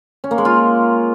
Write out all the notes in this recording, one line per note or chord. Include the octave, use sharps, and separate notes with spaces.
C#4
A#3
G#3
F4